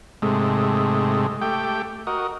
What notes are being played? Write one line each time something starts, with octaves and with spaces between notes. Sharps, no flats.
G#2 C3 G#3 A3
A3 G4 G5
F#4 A#4 D#5